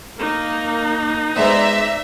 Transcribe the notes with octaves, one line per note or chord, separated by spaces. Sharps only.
A#3 D#4
G#3 B3 C5 D5 E5 A#5